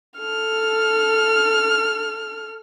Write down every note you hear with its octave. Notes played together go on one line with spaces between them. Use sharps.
A4 F6